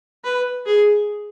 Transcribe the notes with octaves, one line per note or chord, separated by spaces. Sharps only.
B4
G#4